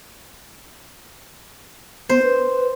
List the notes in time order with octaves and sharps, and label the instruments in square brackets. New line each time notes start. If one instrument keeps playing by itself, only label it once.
[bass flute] B3 [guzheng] C5
[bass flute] B4